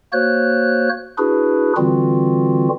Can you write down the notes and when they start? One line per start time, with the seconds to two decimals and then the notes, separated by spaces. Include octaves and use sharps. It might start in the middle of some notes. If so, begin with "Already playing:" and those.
0.13 A#3 F#4 C5 C#5 F#6
1.18 D4 E4 F#4 G#4 B4
1.77 D3 E3 G3 C4 F4 F#4